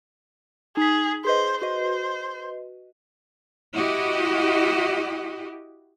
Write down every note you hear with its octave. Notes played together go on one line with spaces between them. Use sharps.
D#4 G#4 B6
G#4 B4 C5 D#5
F#4 B4 C5 D#5
E4 F#4 G4 D#5